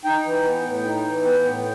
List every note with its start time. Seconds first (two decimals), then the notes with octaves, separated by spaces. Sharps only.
0.05 D#4 G5
0.25 E3
0.45 B3
0.65 A2
0.85 D#4
1.06 E3
1.25 B3 G5
1.45 A2